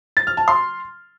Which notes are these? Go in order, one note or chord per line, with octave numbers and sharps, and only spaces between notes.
A6
F6
A5
C6